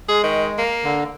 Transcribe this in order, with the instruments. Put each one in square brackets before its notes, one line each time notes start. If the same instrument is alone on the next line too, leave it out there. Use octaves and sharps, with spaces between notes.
[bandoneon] G#3 [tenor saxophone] G#4
[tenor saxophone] D#3
A#3
[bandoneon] D3